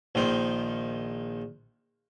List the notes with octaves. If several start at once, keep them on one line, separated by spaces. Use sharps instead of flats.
A#1 D#3 C5